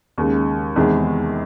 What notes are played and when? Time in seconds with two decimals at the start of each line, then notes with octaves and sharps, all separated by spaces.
0.18 D#2 C#3 G#3
0.76 E2 C3 D#3 G#3